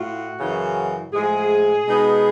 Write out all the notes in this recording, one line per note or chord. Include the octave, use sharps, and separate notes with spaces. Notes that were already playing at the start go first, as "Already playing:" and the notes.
Already playing: A2 F4 F#4
F#2 C#3 E3
A2 F3 G#3 G#4
B2 G#3 B3 D#4